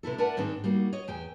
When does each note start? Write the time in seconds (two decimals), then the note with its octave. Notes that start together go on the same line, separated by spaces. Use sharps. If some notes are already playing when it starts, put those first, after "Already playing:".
0.03 C3 B3 E4 A4
0.18 A#4 B4 D5 E5 F#5 A5
0.37 G#2 D#3 C4 D4
0.64 G3 A#3 D#4 F#4
0.93 C#5 D#5
1.08 E2 G5 G#5